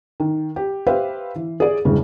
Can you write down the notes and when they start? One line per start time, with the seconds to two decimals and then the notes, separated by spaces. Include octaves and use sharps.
0.20 D#3
0.56 G4
0.87 G4 B4 C5 E5 F5
1.36 E3
1.60 G#4 D5
1.85 E1 G2 C#3 E3